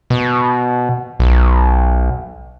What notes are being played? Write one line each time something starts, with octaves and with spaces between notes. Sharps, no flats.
B2
B1